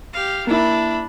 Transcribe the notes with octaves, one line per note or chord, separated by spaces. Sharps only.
G4 F5
A#3 D4 E4 B5